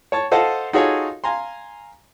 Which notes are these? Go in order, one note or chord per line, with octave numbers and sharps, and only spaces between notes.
C#5 A5 C#6
A4 C5 D#5 F5 F#5 A5
D#4 F4 F#4 G#4 A4 C#5
F5 G#5 A#5 C6